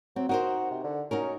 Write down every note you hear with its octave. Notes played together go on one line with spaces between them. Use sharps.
F#3 C4
D#4 F#4 A#4 C5
C3
D3
C#4 D#4 F#4 A#4